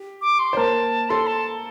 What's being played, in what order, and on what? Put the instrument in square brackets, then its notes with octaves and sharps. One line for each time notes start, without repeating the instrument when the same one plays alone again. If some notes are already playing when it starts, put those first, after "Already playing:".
Already playing: [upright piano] G4
[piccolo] D6
C6
[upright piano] C5
[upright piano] A#3 A#4 [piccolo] A5
[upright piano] A4 [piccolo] C6
[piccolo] A5